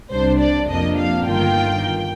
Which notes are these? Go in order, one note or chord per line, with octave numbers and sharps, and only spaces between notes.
C2 C3 G3 D4 C5
D5
F2 C3 F3 A#3 D4 D#5
F5
G1 G2 D#3 A#3 F4 G5